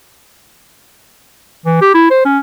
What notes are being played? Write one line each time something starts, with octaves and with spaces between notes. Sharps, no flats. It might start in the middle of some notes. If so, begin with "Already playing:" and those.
E3
G4
E4
C5
C#4